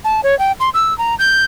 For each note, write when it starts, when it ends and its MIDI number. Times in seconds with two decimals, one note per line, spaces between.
0.04 0.21 81
0.23 0.37 73
0.39 0.52 79
0.60 0.70 84
0.74 0.96 88
0.98 1.15 82
1.19 1.45 91